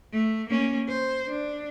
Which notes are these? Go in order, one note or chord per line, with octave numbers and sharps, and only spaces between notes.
A3
A#3 C#4
C5
D4